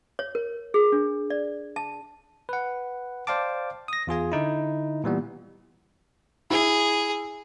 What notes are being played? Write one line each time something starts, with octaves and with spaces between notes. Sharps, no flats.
C#5
A#4
G#4
D4
D5
A5
B4 F#5
C5 D5 F5 G5 A5 D6
D#6 A#6
E2 F4 G#4 G#5
D3 D#4 E4
A#2 E3 G3 B3
E4 G#4